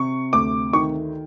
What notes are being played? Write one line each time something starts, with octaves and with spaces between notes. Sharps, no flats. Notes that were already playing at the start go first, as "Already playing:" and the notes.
Already playing: C3 C#6
D2 D6
D#3 C#6